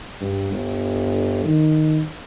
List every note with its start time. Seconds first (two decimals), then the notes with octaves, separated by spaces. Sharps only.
0.21 G2
0.52 G1
1.45 D#3